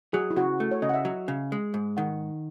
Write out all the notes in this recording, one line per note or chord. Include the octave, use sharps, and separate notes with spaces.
F#3 G#4
E4
C#3 F#4
A3
C#5
C#3 D#5
F#5
E5
F#3
C#3
G#3
G#2
D#3 F#5